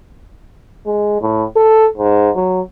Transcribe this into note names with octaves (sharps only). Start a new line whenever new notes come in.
G#3
A2
A4
G#2
F#3